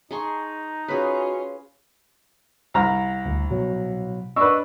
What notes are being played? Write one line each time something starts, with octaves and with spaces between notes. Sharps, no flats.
D#4 G#4 A5 A#5 C6 C#6
C#4 F4 F#4 G#4 B4
C2 A#5 F6
D2
B2 F#3
D4 B4 D#5 C#6 E6